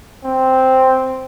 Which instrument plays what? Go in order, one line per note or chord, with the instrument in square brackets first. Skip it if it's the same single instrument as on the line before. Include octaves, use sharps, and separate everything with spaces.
[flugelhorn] C4